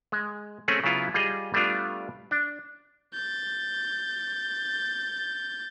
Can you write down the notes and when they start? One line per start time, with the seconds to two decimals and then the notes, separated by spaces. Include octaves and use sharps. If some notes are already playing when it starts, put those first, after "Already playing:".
0.12 G#3
0.68 A3 C4 C#4 G#4
0.84 C#3 F#3 B3 E4 F4
1.14 G3 F4 G#4 D#5
1.54 G3 A3 B3 D4 F4
2.31 D4
3.14 G6 A6